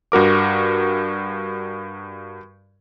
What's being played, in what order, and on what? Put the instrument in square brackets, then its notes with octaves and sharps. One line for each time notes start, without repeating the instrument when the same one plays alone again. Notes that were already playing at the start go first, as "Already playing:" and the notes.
[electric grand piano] G2 F#4 A#4 D6